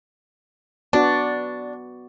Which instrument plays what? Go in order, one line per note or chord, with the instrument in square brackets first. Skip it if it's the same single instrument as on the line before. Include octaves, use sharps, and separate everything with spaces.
[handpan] B3 F#4 D5 [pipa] D4